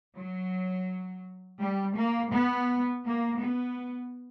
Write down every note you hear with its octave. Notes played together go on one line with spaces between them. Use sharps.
F#3
G3
A#3
B3
A#3
B3